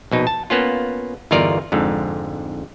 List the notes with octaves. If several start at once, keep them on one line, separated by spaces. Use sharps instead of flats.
A#1 B2 D#4
A5
A#3 B3 C#4 F4
G1 E2 D#4 F4 A#4 D5
F2 G#2 D3